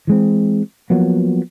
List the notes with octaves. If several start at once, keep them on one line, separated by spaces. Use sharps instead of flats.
E3 G#3 C4
F3 F#3 A#3 B3